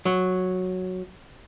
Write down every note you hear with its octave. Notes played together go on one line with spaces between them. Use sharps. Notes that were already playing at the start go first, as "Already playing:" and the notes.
F#3